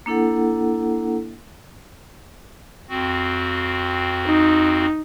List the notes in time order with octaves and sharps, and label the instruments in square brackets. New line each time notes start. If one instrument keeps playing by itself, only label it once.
[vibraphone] A#3 D4 E4 A4 F#5
[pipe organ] F2 C4 F#4
[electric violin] D#4